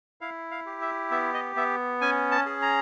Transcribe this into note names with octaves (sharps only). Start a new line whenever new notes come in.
E4 F5
F5
G4
E5
B3 E5
D#5
B3 E5
C#4 G#5
A5
G#4
A#5